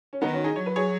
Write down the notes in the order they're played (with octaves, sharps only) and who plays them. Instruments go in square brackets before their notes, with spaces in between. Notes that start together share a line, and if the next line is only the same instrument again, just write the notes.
[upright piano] C#4
[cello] D#3 [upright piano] B3 D#4
[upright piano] C#4 F#4
D#4 G#4
[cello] F#3 [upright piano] C#5
[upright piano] B4
G#4 C#5